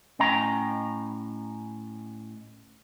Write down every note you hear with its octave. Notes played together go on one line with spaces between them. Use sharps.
A2 C#4 D#5 G5 A#5